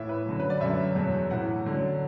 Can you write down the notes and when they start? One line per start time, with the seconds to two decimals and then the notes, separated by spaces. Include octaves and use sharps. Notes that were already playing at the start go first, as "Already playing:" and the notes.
Already playing: A2 E3 E5
0.09 B4
0.26 F#2 D3 F#3
0.40 B4
0.50 D5
0.60 F#2 D3 F#3 E5
0.95 E2 B2 F#3
1.30 A2 E3 F#5
1.65 F#2 D3 F#3